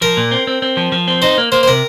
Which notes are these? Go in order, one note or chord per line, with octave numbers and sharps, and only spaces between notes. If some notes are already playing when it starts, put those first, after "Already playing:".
F3 A#4
A#2
C4
C4
C4
F3
F3
C4
D#4 C5
A#3
A#3 C5
C5
C3 A#4